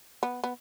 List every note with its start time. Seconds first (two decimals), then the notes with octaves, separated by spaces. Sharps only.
0.23 B3
0.44 B3